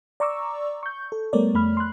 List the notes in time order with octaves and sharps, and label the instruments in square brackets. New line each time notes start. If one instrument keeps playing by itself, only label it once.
[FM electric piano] D5 A#5 C#6 D6 E6
C#6 G6
A4
G3 A3 B3 A#4 C#5 D5
F2 A3 B5 F6
C6 F#6